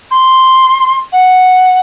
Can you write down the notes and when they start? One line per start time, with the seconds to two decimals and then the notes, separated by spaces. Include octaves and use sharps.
0.11 C6
1.12 F#5